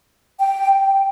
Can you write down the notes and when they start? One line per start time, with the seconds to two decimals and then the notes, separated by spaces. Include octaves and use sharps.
0.39 G5